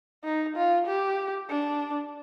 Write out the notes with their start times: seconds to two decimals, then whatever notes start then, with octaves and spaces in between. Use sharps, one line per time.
0.24 D#4
0.56 F4
0.87 G4
1.50 D4